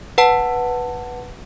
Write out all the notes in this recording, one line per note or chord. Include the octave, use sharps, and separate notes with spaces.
B4 F#5 A5